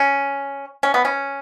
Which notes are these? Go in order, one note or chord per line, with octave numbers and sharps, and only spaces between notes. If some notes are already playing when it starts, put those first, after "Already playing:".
Already playing: C#4
C#4
B3
C#4